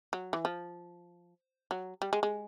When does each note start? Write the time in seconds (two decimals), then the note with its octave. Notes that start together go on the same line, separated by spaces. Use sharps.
0.13 F#3
0.33 E3
0.45 F3
1.71 F#3
2.02 G3
2.13 G#3
2.23 G#3